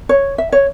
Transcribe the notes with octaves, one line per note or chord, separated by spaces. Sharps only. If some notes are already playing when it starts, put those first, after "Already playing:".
C#5
E5
C#5